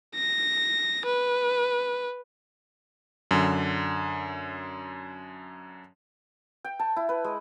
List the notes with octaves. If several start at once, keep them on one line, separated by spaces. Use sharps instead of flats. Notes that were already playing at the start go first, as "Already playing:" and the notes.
A#6
B4
F#2 D3
G5
A5
E4
B4
G#3